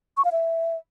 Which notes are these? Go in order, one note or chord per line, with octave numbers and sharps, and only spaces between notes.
C#6
F5
E5